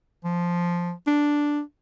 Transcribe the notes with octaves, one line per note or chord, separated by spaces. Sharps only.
F3
D4